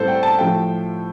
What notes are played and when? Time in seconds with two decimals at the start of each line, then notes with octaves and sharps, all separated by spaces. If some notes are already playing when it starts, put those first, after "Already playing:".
Already playing: A2 G3 C4 A4 C5
0.08 G5
0.23 A5
0.38 A2 F3 A3 G5